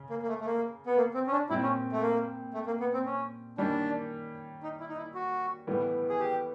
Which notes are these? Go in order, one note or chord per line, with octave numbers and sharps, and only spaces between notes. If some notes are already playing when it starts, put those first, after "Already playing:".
Already playing: C#3
A#3
A#3
A3
A3
A#3
B3
A#3
C4
C#4
D4
A#2 G3 C4 E4
C#4
A3
A#3
A3
A#3
B3
C4
C#4
D#3 G3 A#3 C#4 D4
D#4
E4
D#4
E4
F#4
A2 E3 G3 B3
G#4
G4